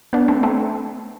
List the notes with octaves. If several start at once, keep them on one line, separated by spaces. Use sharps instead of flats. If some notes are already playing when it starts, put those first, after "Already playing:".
B3 D4
A3 C4
A3 C4